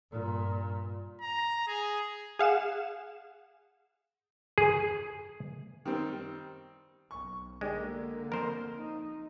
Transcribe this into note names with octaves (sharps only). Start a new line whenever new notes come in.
G2 A#2
A#5
G#4
G#4 F5 F#5 E7
G#4
D#3 G3 C4
B1 C#6
D3 G#3 A#3 D4 G4
F2 A#4 C5 F6
D#4